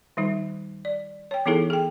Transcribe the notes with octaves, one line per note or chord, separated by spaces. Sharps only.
D#3 G3 D#4
D5
C#5 G5
E3 B3 D#4 E4 G#4 A4
G#4 G5